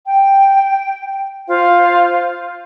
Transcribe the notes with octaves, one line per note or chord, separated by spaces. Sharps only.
G5
F4 C5 F5